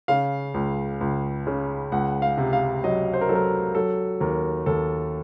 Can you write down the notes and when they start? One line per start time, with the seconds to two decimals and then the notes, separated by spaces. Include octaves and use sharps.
0.08 C#3 F5
0.54 C#2
1.01 C#2
1.47 C#3
1.92 C#2 F#5
2.22 F5
2.38 C3
2.53 F5
2.84 F#3 D#5
3.14 C5
3.21 A#4
3.29 F#3 A4
3.35 A#4
3.75 F#3 A4
4.21 D#2 A#4
4.66 D#2 A4